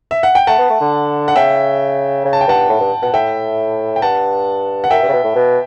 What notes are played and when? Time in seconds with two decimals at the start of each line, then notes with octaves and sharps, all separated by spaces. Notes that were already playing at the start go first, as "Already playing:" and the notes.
0.11 E5
0.23 F#5
0.35 G5
0.47 A3 F#5 A5
0.58 B3
0.70 A3
0.80 D3
1.28 F#5
1.36 C#3 E5 G5
2.24 C#3
2.33 A5
2.41 G5
2.47 G2 F#5 A5
2.69 A2
2.80 G2
3.02 B2 F#5
3.13 A2 E5 G5
3.96 G5
4.02 G2 F#5 A5
4.84 F#5
4.90 F#2 E5 G5
5.02 G2
5.09 C#3
5.13 B2
5.24 A2
5.35 B2